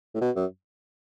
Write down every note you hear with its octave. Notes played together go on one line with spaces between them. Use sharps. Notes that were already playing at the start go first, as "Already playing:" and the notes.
A2
B2
F#2